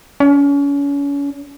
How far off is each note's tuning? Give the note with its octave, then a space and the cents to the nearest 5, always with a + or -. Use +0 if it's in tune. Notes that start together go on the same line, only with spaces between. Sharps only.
C#4 +35